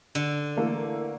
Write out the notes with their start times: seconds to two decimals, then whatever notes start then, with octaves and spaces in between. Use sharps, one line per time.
0.15 D3
0.57 E3 A3 A#3